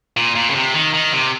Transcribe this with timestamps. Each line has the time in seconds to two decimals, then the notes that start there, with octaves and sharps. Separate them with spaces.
0.17 A#2
0.36 A#2
0.50 C#3
0.55 C3
0.74 D#3
0.94 D#3
1.13 C3